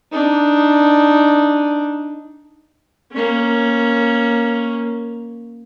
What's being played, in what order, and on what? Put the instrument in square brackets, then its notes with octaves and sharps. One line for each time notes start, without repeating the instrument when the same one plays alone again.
[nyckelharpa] D4 D#4
A#3 C#4